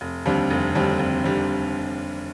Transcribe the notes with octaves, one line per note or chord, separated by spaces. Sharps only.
F1
D#2 D3 G3 C4
F1
D#2 D3 G3 C4
F1
D3 G3 C4